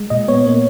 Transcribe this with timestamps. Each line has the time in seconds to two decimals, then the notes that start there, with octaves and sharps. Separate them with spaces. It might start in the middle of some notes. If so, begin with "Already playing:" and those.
Already playing: G#3
0.10 A#2 D#5
0.28 B3 C#5
0.46 A#3